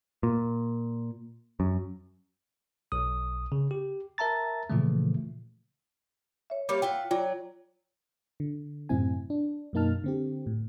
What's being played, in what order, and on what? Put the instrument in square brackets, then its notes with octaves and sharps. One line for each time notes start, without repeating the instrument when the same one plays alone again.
[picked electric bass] A#2
F#2
[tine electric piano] B1 D#6
C#3
G4
A#4 E5 A5 A#5 A6
A#2 C#3 E3 F3 A3
[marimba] C#5 E5
[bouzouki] G3 A#3 C#5 [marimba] D6
[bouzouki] F4 E5 F#5 [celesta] G5
[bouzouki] F#3 D5 [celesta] F4 G5
[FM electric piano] D3
F#2 A2 C3 C4 E4 G#5
D4
F#2 B2 A#3 D#4 A5 F6
D3 C4 G4
A2